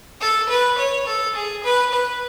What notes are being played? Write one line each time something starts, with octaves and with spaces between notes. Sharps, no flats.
A4
B4
C#5
A4
G#4
B4
B4